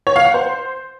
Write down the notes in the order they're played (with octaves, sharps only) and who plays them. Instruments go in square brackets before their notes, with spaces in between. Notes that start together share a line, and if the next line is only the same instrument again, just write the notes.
[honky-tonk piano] C#5
F5
F#5
C5